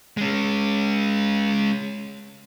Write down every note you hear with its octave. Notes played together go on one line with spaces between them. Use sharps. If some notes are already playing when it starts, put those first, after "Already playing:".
G#3 C#4